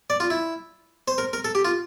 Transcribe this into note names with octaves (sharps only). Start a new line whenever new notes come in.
D5
F4
E4
C5
A#4
A#4
A4
G4
F4